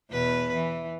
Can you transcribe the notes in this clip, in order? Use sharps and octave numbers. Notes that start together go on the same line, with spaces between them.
E2 B2 B4
E3